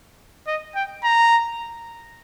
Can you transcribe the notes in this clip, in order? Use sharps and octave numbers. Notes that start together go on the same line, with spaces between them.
D#5
G5
A#5